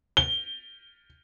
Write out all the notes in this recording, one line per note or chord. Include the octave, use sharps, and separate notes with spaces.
G7